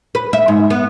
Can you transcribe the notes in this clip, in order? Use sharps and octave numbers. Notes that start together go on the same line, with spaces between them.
B4
E5
G#2
B3